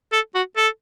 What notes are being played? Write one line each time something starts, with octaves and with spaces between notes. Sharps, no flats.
A4
F#4
A4